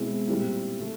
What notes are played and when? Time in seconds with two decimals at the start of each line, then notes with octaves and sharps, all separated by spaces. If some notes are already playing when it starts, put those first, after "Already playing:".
Already playing: B2 G#3 C4 E4
0.28 A#2 G3 C4 E4
0.80 A3